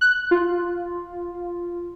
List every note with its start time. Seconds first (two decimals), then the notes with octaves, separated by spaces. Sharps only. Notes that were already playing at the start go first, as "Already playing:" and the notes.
0.01 F#6
0.31 F4